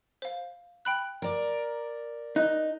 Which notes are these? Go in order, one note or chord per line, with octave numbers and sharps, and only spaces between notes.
C5 F5
G5 B5 F#6
A#4 D5
D#4 F#6